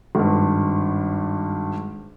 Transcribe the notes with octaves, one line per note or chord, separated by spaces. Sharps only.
G#1 G2